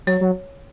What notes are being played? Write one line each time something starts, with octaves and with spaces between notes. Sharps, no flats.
F#3 C#5
F#3